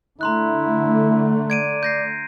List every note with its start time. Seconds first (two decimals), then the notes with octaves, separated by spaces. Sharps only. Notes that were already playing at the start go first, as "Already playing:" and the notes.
0.21 D3 A3 E4 A#5 C6 F#6
1.50 D5 G#6 D7 D#7
1.83 G6 A#6 C7